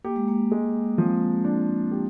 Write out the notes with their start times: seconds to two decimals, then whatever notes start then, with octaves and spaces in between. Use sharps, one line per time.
0.04 A#3 G4
0.16 G#3
0.28 A#3
0.51 G#3
0.98 F3 C4
1.44 D4
1.91 G4